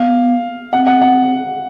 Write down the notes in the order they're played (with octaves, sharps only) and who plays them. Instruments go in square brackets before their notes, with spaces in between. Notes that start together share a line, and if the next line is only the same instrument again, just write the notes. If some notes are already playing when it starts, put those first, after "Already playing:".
Already playing: [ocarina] B3 [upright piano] F5
[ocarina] C4 [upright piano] F#5
[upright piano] F#5
F#5